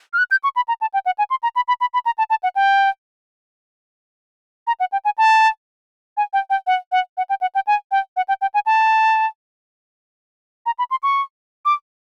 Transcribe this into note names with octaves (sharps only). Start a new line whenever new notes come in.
F6
F#6
G6
C#6
B5
A#5
A5
G5
F#5
G#5
C6
A#5
B5
B5
B5
B5
A#5
A5
A5
F#5
G5
A#5
F#5
G5
G#5
A5
G#5
G5
G5
F#5
F#5
F#5
G5
F#5
G5
G#5
G5
F#5
G5
G5
G#5
A5
A#5
B5
C6
C#6
D6